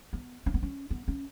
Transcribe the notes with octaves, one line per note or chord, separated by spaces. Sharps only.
B3
C#4
B3
C#4
B3
C#4